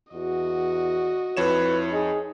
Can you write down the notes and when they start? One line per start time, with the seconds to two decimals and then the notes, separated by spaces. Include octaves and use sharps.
0.13 E2 F#4 D#5
1.37 F2 E4 B4 C#5 E7
1.92 D#4 G#4